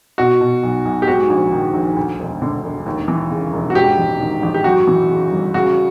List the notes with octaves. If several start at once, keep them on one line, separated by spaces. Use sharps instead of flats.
B2 F#4
B2
B1
B1
G4
G#2 F#4
A#1
D#3
A#1
D2
E1
D3
E1
D#2
E3
C#3
E1
F#4
G#2 G4
A1
D#3
A1
G4
F#2 F#4
E3
C#3
G1
C#3 F#4